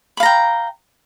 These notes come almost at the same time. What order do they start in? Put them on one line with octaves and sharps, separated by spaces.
B5 F5 A#5 G5